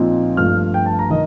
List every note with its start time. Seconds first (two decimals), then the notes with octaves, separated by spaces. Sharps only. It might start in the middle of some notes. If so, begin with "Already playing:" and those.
Already playing: A#2 F3 C4 D#4
0.37 G2 F3 A3 F6
0.74 G5
0.86 A5
0.99 A#5
1.10 D#3 D#5